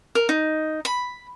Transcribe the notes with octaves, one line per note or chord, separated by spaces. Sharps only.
A#4
D#4
B5